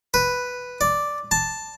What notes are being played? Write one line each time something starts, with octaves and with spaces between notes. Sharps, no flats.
B4
D5
A5